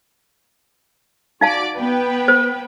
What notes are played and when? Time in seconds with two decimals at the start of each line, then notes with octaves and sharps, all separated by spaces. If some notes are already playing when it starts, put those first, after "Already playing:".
1.41 D#4 F#4 D5 F5 A5 D6
1.76 B3 B4 G5
2.28 C5